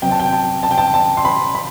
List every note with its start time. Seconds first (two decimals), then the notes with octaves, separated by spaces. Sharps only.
0.02 C3 F#3 B3 G5
0.11 A5
0.20 G5
0.33 A5
0.63 A5
0.71 G5
0.78 A5
0.94 A5
1.17 C6
1.25 B5
1.55 B5